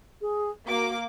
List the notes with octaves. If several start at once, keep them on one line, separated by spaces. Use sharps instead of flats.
G#4
A#3 F#4 D6